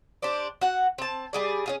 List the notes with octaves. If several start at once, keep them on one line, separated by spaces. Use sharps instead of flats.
D4 G4 C5 D5
F#4 F#5
C4 A5
G3 G#4 D5
C#4 F4 G#4